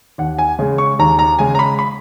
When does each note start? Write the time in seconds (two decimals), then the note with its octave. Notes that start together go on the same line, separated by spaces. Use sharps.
0.18 D#2 F#5
0.38 G#5
0.59 C#3 G#3
0.78 C#6
0.99 D#2 A#5
1.19 A#5
1.39 C#3 G#3 G#5
1.55 A#5
1.59 B5
1.79 B5